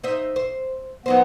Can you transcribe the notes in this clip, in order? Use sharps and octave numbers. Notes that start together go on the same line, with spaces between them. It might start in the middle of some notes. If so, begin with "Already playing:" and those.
D#4 C5 E5
C5
F#3 B3 D#4 C5